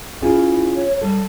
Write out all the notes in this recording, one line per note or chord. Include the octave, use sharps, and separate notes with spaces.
C#4 E4 F4 G#4
C#5
G3 A4